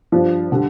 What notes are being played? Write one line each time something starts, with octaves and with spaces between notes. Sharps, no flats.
G2 F3 D4 F4
D3 G3